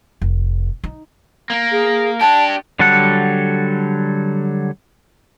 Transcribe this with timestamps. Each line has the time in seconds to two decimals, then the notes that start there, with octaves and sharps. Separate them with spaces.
0.22 F1
0.84 D#4
1.50 A#3
1.72 G#4
2.21 D4 G4 A5
2.79 D3 F#3 G3 A4 F#5